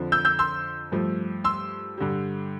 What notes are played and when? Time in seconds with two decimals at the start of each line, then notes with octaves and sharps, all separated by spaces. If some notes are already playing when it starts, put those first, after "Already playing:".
Already playing: F2 D3 F3
0.12 E6 G6
0.25 E6 G6
0.39 C6 E6
0.92 G2 F3 A3
1.44 C6 E6
1.98 G2 D3 G3